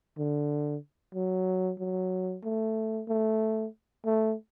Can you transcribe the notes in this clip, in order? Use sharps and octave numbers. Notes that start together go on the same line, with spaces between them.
D3
F#3
F#3
A3
A3
A3